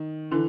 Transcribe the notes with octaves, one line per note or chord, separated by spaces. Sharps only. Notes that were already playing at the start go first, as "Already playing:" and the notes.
Already playing: D#3
D3 E3